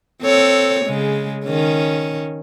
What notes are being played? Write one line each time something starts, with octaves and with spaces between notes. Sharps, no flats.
C4 A4 C#5
C#3 G#3
D#3 C#4